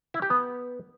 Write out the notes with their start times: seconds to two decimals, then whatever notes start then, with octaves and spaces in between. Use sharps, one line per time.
0.14 E4
0.22 G4
0.30 B3